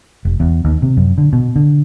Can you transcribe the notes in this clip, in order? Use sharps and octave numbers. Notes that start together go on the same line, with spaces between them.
F1
E2
D#2
C3
F#2
D3
B2
D3